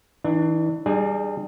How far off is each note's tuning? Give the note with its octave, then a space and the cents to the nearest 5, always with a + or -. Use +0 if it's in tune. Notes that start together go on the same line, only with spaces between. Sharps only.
E3 -30 D4 +30
G3 +0 D#4 -45 G#4 +0